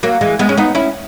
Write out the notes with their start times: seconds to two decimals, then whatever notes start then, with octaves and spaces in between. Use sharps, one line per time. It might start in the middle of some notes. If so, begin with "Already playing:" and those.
0.03 F#3 A#3
0.21 E3 G#3
0.39 G#3 B3
0.49 C#4
0.57 B3 D#4
0.75 C#4 E4